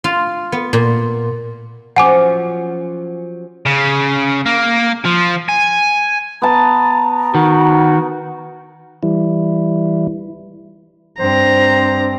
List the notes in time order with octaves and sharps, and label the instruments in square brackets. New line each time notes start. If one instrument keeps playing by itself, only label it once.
[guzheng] F4
B3
A#2
[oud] F3 F#3 C#4 [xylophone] F#5 G#5 D6
[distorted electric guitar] C#3
A#3
F3
G#5
[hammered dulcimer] B3 A5 [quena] A#5
[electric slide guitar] D#3 [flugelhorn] F#4
[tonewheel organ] E3 G3 E4
[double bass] G2 C4 [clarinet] C5 [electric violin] A#5